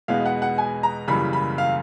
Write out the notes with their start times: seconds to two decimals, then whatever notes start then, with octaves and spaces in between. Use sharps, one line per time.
0.08 E2 B2 G#3 B3 F5
0.25 F#5
0.42 F#5
0.58 G#5
0.83 A#5
1.08 F#1 F#2 C#3 E3 G3 B5
1.33 B5
1.58 F5